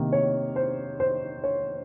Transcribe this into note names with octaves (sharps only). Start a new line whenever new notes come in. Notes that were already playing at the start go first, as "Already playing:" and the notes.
Already playing: C3 D#3 A#3 D#5
C#5
C5
C5
C#5